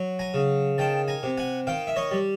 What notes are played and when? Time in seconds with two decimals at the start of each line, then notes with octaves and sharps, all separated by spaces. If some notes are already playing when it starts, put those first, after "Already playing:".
Already playing: F#3
0.19 G#5 A#5
0.34 C#3
0.78 D#3 G5 A5
1.08 G#5 A#5
1.23 C3
1.37 F#5 G#5
1.67 D#3 F5 G5
1.87 E5
1.96 C#5 D#5
2.11 G3